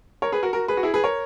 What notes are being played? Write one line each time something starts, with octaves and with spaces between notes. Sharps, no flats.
A#4 C#5
G#4 B4
F#4 A#4
F#4 A#4
G#4 B4
F#4
E4 G#4
G#4 B4
A#4 C#5